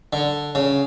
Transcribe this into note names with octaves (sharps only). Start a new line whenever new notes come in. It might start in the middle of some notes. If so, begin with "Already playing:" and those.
D3
C#3